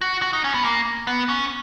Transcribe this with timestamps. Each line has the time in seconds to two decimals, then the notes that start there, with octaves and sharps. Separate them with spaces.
0.01 F#4
0.22 F#4
0.33 D#4
0.44 C#4
0.54 B3
0.65 A#3
1.07 B3
1.29 C#4